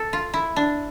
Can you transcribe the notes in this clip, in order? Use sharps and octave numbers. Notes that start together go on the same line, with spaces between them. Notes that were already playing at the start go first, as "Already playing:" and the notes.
Already playing: A4
F4
E4
D4